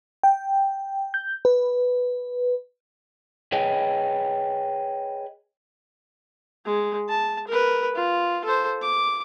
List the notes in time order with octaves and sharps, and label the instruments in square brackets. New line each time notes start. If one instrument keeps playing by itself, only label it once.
[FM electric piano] G5
G6
B4
[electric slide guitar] G#4 B4 C#5 D#5 G5
[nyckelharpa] G#3
A5
A#4 B4
F4
A4 C5
D6